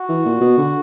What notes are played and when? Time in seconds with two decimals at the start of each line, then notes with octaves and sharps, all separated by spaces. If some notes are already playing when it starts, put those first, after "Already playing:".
Already playing: F#4
0.09 E3
0.26 A#2
0.41 B2
0.58 D3